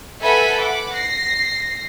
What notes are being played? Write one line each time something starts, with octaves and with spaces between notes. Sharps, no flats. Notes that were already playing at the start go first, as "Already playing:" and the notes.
A4 B4 E5 F#5 G#5 B5
F#5 B5 D6
A#6 C7